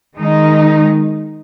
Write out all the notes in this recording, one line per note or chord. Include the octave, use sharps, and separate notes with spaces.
D#3 G#3 D#4